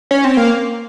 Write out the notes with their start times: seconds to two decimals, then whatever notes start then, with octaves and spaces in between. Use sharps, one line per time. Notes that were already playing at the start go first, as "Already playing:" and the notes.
0.11 C#4
0.25 C4
0.37 A#3